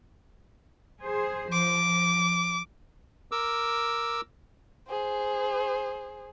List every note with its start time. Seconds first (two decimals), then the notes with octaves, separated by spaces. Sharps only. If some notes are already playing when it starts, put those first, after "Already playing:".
1.02 G#4 C5
1.53 F3 D6
3.32 A#4 D6 E6
4.88 G#4 C5